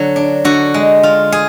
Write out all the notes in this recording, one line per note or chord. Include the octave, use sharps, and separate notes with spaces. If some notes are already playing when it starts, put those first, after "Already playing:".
Already playing: D3 F#3
D4
D3 F#4
G#3
F4
G#4